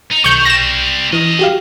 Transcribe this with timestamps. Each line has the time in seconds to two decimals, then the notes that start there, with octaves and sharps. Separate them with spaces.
0.11 D#4
0.24 B1 D#3 C#6 G6
0.45 G3 C4 A#6 E7
1.13 F#2 E3 D#5
1.39 F#4 G4 F5